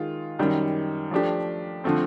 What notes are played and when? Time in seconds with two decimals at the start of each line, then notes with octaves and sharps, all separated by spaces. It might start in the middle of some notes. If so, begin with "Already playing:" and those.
Already playing: D#3 G#3 F4
0.39 F#2 D#3 G3
1.11 F3 A3 D4 G4
1.84 D3 F3 A3 C4